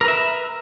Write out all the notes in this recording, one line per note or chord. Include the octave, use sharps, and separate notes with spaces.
A#4 B4 E5